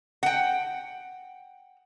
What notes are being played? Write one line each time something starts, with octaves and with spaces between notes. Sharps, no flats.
F#5 G5